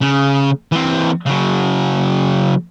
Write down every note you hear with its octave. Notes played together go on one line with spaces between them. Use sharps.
C#3
E3 C4
C#3 F#3